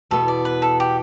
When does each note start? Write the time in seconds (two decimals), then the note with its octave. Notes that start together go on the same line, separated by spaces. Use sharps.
0.11 E2 B2 B3 A4
0.28 D5
0.45 B4
0.62 A4
0.80 G4